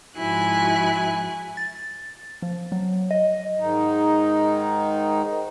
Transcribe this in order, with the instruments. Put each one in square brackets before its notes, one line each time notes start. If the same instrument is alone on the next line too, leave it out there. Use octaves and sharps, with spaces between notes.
[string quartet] G#2 F3 E4 F#4 G#5 F#6
[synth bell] A6
F3
F#3
D#5
[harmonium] G#2 D#3 D#4